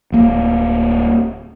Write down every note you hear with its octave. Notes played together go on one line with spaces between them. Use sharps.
D1 A#3